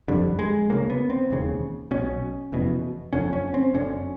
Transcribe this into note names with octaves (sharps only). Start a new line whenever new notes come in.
F#1 F2 D3 G3
G#3
D2 C#3 A#3
B3
C4
E1 D#2 C#3
B1 B2 C#4
F1 E2 B2
F#1 F2 D3 C#4
C#4
C4
F#1 F#2 D3 C#4